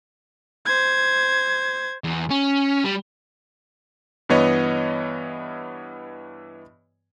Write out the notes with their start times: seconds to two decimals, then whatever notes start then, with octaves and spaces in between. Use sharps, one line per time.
0.65 C5 G#6
2.04 E2
2.31 C#4
2.84 G3
4.29 G2 E3 B3 C#5 D#5